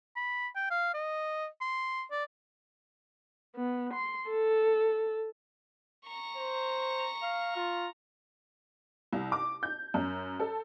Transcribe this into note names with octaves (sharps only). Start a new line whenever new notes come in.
B5
G5
F5
D#5
C6
D5
B3
C6
A4
A#5 C#6
C5
F5
F4
C2
D6
G6
F#2
A4